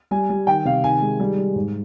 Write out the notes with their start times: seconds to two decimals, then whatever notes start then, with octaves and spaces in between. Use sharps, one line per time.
0.11 G3 G#5
0.30 G3
0.47 D#3 G5
0.65 C3 F5
0.84 D#3 G#5
1.02 G#3
1.20 G3
1.38 G3
1.56 G#2